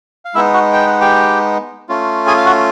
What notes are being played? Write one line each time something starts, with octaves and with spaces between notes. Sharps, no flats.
F5
G#3 B3 D#4 E4 E5
F#4 F#5
G5
F#5
G4 G5
A3 C#4 F4
G#4 G#5
F5
F#4 F#5